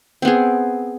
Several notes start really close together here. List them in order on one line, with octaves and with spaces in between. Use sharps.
C4 B3 G#4